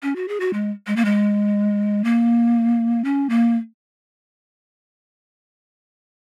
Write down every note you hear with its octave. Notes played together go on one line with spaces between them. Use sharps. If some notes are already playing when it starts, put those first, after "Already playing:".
C#4
F#4
G#4
F#4
G#3
G#3
A#3
G#3
A#3
C#4
A#3